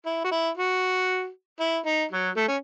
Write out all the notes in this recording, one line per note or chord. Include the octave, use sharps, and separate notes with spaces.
E4
F#4
E4
F#4
E4
D#4
F#3
A3
C#4